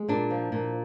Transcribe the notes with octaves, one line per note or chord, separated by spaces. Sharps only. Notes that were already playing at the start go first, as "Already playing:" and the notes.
Already playing: G#3
A#2 D4
F3
A#2